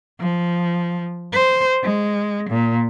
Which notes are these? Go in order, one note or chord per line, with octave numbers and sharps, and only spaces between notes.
F3
C5
G#3
A#2